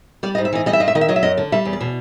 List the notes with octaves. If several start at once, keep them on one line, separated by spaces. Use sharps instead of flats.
G3 D5
D#5
G#2
E5
E3 D#5
G3 D#5
E5
G2 D#5
E5
D#3 D#5
E5
F#3 D#5
E5
F#2 D#5
D3
G3 E5
E2
D5
B2